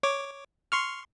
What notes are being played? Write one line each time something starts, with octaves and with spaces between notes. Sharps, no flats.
C#5 D6
C6 C#6 F6